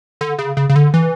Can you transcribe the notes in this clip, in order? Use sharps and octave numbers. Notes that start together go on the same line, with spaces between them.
D3
C#3
C#3
C#3
D3
E3